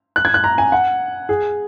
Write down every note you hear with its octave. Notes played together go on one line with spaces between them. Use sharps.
F#6
G#6
F#6
A#5
G#5
F#5
G#4